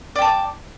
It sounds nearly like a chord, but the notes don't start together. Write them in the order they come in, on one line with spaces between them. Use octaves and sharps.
D5 G5 A5 D6